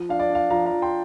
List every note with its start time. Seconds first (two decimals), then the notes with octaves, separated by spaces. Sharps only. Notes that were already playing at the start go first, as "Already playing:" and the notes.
Already playing: F3
0.09 D4 F5
0.19 D5
0.30 D4 F5
0.50 F3 F5 A#5
0.66 F5 A#5
0.71 F3
0.82 G5 C6